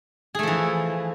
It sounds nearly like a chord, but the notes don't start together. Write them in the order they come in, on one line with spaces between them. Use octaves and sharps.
G#4 A3 F3 E3